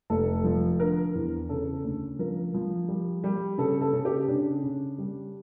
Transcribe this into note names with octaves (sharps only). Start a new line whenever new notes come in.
F1 A4
F3
D3 A#4
E2
C#3 A4
D2
F3 A#4
F3
G3
G3
C#3 A4
A4
C#3
G4
C#3 D4
C#3
G3